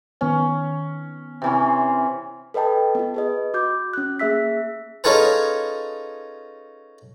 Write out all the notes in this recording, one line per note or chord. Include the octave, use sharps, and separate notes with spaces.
D#3 B3 C#4 C#5
C3 E3 C#4
C6
A4 B4 D#5 G5 A5
B3 F4
G#4 B4 D#5
F#4 D6 G6
C#4 F#6
A#3 G#4 E5 E6 B6
C#4 D#4 F4 G#4 A4 B4